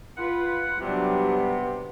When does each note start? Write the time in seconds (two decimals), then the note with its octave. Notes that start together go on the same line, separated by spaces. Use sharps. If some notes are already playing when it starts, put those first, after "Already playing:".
0.17 F4 B4 F#5
0.81 C3 F#3 G3 B3 D4